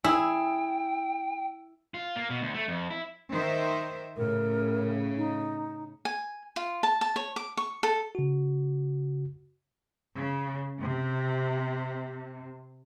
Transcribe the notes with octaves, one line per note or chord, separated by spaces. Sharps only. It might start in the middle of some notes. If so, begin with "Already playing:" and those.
E4 G#4 G5 E6
F4
A#3
B2
D2
A3
F2
E4
D#3 C5 E5
A2 C#3 A#4
D#4
G#5
F4
A5
A5
C#5
D6
C#6
A4
C#3 F#4
C#3
C3